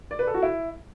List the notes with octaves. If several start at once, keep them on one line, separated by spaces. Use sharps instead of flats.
D5
B4
A4
F#4
E4